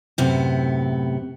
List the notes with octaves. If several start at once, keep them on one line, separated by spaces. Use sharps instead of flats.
F#2 A2 C3 B3